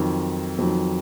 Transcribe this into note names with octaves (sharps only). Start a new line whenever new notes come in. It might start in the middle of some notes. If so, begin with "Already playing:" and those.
Already playing: F2 D#3 F#3
F2 D#3 F#3